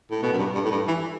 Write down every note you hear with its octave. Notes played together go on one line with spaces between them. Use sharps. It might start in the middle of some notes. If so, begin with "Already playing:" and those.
A2
B2
F#2
G2
G2
A2
G2
E3